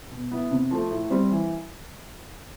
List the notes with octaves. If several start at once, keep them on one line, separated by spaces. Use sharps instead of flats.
B2
B3 E4
C3
F3 A3
A2
G3 C4
E3